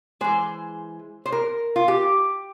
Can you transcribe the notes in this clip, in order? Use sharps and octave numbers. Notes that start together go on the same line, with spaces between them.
E3 G#3 C5
C5
A#4
F4
G4